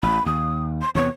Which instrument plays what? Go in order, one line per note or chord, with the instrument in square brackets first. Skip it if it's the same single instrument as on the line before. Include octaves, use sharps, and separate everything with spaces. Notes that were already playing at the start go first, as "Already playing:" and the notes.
[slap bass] A1 [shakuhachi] B5
[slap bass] D#2 [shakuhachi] D#6
[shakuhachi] C6
[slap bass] E2 C3 B3 [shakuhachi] C#5